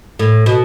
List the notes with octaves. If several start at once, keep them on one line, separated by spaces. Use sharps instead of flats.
A2
B2